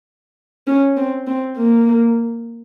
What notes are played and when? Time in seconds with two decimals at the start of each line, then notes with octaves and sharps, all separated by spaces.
0.67 C#4
0.97 C4
1.27 C4
1.57 A#3